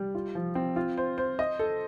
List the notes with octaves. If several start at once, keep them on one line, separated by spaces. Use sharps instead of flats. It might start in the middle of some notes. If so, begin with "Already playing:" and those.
Already playing: G3
F4
F3
C4
F4
C5
C5
D#5
A4